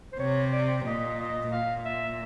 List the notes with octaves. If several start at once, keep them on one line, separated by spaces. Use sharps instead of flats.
C5
C3 C#5
D5
A#2 D#5
D#5
A#2 F5
E5